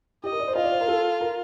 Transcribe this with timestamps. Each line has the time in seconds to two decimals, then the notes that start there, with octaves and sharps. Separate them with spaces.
0.24 G4 D#5
0.32 A#4
0.40 D5
0.48 C5
0.56 F4 D#5
0.64 D5
0.72 C5
0.81 A#4
0.88 A4
1.21 A#4